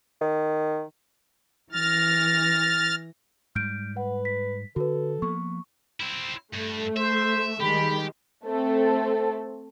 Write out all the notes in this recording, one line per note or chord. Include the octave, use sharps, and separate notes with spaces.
D#3
E3 F6 A6 A#6
G#2 G3 F6 G6 D7
B4 F#5
B6
D3 F#4 A4 B4
F3 A#3 B3 C#6
C4 E4
G2 A3
C5 E5
D#3 G3 G#3 G4 B5
A3 C4 A4